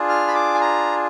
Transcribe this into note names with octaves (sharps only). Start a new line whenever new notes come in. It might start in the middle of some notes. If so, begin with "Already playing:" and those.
Already playing: D4 F4 G#4
F6
B5
D6
G#5
A#5